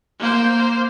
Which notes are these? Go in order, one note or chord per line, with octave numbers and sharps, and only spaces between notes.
A#3 C5